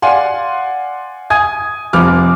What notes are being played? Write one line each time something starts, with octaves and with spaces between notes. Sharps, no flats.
D5 F5 F#5 G#5 C6
G#5 D#6 G#6
F1 F3 D6 F6